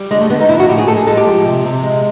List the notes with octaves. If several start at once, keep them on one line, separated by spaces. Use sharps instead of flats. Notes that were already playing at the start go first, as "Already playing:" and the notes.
Already playing: G3
D3 G#3
A3
D3 B3
D#4
F3 E4
F#4
A2 G4
G#4
A2 A4
G#4
G#3 A4
G4
F3
C3
C3
G#3